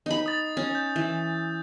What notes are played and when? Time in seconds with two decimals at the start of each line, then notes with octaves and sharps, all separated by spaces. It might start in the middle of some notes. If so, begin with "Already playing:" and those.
0.06 D#4 B5
0.26 D#6 A6
0.57 C#4
0.75 G6
0.96 E3